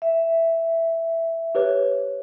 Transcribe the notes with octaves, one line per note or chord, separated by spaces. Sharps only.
E5
G4 B4 C#5